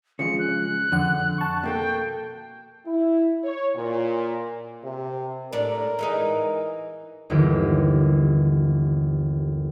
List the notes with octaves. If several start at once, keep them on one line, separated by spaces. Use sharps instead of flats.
C#3 F3 G#3 C#7
F#6
F2 D3 F#5
A5 C#6
B2 A#3 A4 G5
E4
C#5
A#2
C3
A2 D4 A#4
E3 G#3 D#4
G1 D#2 D3 E3 G4